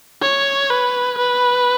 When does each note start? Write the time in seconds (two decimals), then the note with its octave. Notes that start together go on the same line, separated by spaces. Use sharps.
0.22 C#5
0.70 B4
1.18 B4